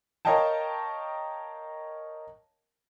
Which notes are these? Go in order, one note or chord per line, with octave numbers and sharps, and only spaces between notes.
A#4 C#5 D#5 F5 G5 A5